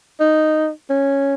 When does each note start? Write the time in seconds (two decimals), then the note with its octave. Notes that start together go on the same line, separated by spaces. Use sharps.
0.20 D#4
0.90 C#4